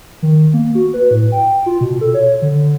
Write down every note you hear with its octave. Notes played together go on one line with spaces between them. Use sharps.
D#3
A#3
F#4
B4
A2
G5
F4
B2
A4
C#5
D3